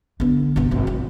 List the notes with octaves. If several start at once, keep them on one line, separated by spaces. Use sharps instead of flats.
D3 B3
G1 C3
G#1 C4
E4